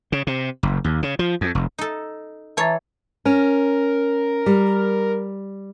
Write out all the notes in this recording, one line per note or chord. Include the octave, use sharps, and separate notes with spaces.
C#3
C3
F#1
D#2
C#3
F3
F2
F1
D#4 A4
E3 C#5 A5 A#5 A6
C#4 A#4
G3